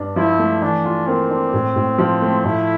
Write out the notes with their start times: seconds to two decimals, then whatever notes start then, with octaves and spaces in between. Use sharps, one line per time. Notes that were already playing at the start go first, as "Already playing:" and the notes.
Already playing: G2 D4
0.16 F3 E4
0.39 A3
0.61 E3 D4
0.85 F4
1.07 A#3 C4
1.30 D4
1.53 A2
1.76 A2
1.98 F3
2.21 A3
2.45 A2 E4